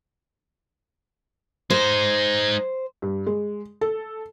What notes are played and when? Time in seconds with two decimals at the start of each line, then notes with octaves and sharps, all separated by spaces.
1.70 G#3 D#4 C5
3.02 G2
3.26 G#3
3.81 A4